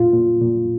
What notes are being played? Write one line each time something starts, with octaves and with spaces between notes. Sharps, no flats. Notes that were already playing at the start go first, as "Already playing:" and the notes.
Already playing: A#2 F4
A#2
A#2